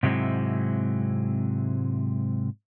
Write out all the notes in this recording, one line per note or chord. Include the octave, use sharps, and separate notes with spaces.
G#2 C3 F#3 G#3 C4 E4